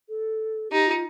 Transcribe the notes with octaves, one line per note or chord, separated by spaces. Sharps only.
A4
D#4 G4
F4